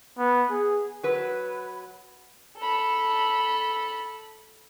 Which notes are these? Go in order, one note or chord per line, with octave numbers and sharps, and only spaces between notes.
B3
G#4
F#3 B4
A4 B5